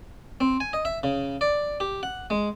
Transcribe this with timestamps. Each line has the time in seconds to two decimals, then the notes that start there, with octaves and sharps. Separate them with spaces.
0.41 C4
0.60 G#5
0.73 D#5
0.85 E5
1.03 C#3
1.41 D5
1.80 G4
2.03 F#5
2.30 G#3